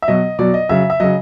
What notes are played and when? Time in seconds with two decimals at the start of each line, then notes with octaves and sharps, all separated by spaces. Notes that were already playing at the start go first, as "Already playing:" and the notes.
0.02 E5
0.08 B2 F#3 D#5
0.39 B2 F#3 D5
0.54 D#5
0.69 C#3 F#3 E5
0.90 E5
1.00 C#3 F#3 D#5